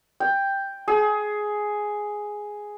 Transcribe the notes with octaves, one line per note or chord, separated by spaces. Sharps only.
G5
G#4